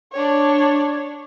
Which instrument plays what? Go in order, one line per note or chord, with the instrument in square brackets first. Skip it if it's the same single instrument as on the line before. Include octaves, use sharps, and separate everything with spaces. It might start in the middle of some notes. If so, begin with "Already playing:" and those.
[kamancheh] D4 C#5